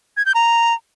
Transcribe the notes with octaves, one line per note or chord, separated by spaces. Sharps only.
G#6
G6
A#5